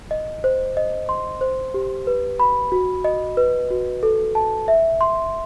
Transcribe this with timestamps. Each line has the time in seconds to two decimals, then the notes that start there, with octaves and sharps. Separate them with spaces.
0.11 D#5
0.44 C5
0.77 D#5
1.09 C6
1.41 C5
1.74 G4
2.07 B4
2.40 B5
2.72 F#4
3.05 D#5
3.37 B4
3.71 F#4
4.03 A4
4.35 A5
4.68 E5
5.01 C6